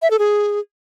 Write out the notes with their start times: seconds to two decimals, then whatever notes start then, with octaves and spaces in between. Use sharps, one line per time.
0.02 E5
0.11 A4
0.19 G#4